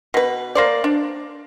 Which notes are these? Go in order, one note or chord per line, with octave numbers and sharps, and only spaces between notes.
B2 B4
A#3 C5 D5
D4